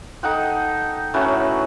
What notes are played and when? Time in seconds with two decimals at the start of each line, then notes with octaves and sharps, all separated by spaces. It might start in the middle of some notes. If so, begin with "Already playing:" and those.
0.23 D#4 A4 F#5 G5
1.14 A2 F#3 C#4 B4